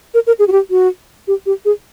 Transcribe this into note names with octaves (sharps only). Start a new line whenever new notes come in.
A#4
A#4
G#4
F#4
G4
F#4
G4
G4
G#4